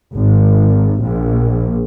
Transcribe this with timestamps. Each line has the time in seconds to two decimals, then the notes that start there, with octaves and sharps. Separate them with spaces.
0.14 G#1
1.02 A#1